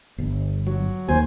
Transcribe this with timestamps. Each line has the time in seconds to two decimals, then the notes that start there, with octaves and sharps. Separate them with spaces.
0.18 G1
0.67 F#3
1.09 D#2 C5 G#5